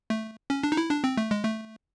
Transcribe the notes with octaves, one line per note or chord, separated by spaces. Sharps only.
A3
C#4
D4
D#4
E4
D4
C4
A3
G#3
A3